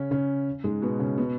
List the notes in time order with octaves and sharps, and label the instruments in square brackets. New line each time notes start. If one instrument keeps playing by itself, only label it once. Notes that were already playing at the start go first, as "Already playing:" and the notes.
Already playing: [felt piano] C#3 C#4
C#3 C#4
G#2 G#3
B2 B3
C#3 C#4
B2 B3